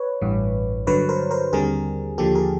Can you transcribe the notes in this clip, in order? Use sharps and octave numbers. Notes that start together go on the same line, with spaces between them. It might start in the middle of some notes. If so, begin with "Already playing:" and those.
Already playing: B4 C#5
A1 G2 E3
G2 D3 F#3 B4 C#5
A#4 C5
A#4 C5
D#2 D3 G3 C4 G#4 A#4
D#2 D3 F3 A#3 G4 A4
G#4 A#4